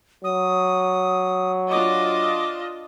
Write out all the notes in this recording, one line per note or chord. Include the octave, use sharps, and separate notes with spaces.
F#3 D#6
D4 F4 D#5 D6